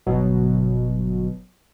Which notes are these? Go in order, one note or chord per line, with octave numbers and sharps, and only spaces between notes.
G1 B2 F#3